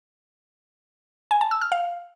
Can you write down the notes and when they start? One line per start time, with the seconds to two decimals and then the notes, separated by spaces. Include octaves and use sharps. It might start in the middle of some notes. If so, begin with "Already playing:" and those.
1.31 G#5
1.41 A5
1.51 E6
1.61 F6
1.72 F5